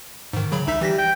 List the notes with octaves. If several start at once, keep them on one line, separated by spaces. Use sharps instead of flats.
G#2 D#3
C#3 F#3 B5
C2 D#4 E5 B6
E3 G3 A#6 B6
G5